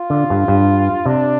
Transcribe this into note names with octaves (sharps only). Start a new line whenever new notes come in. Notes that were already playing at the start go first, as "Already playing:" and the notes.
Already playing: F4
D3
G2
G2
C3 D4